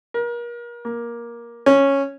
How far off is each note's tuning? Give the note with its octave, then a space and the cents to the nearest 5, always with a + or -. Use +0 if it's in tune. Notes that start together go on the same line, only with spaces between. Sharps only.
A#4 +35
A#3 +15
C#4 -5